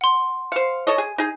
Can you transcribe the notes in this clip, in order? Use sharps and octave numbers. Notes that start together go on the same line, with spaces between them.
F#5 C6
C5 F5 C#7
A4 C#5 D#5
G#4
D#4 G#4